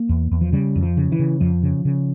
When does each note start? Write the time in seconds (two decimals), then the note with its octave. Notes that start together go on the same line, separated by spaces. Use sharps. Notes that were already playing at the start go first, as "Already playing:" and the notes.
Already playing: A#3
0.09 E2
0.31 E2
0.41 F3
0.52 C#3 G3
0.75 F2
0.83 F3
0.97 C#3
1.12 E3
1.19 C#3
1.40 F2 F3
1.63 C#3
1.85 C#3